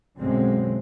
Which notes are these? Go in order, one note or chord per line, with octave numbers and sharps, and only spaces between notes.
B1 F#2 D3 G#3 C4